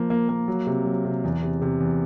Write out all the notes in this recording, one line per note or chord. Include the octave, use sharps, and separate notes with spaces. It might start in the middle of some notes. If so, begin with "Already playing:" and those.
Already playing: F3 A#3
A#3
A#3
F#3
C3
F#3
C3
E2
C3
C3
E2